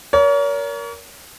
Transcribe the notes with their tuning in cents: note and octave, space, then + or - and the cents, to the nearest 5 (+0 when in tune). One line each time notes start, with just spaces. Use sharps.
A#4 +10 C#5 +40